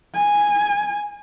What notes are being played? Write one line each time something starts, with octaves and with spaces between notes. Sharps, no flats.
G#5